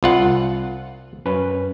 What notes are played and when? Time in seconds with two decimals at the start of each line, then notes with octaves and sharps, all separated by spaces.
0.03 C2 F4 F#5
1.25 F#2 C#4 B4